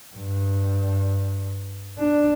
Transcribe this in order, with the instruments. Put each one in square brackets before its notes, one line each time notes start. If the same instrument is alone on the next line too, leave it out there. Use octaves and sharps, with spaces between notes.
[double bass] G2
D4